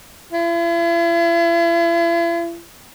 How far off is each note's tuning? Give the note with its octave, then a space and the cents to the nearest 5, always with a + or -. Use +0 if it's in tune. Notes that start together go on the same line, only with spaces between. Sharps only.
E4 +45